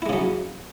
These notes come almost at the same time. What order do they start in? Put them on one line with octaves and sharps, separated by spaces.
E4 G#3 C#3 F#3